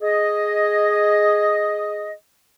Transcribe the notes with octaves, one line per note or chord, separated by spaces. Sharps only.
G#4 D#5